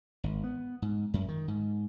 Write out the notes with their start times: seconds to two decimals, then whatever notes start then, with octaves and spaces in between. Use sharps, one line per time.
0.24 G#1
0.44 B3
0.82 G#2
1.14 F#2
1.29 D#3
1.48 G#2